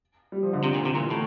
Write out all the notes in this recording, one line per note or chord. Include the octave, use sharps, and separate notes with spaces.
G3
F3
D3
C3
A#2
C3
A#2 E3
A2